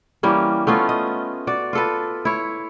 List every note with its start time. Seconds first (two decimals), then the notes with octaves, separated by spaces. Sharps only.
0.23 E3 G3 A#3 C#4
0.67 A3 B3 C#4 F4
0.89 D#5
1.47 F#4 D5
1.73 F4 A4 B4
2.25 E4 C#5